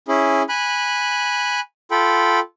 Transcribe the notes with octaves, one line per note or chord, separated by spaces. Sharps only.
C#4 E4 G#4
G#5 B5 F#6
F4 A4 G5 B5